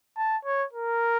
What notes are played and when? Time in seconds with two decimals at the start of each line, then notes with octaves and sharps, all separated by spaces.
0.17 A5
0.45 C#5
0.73 A#4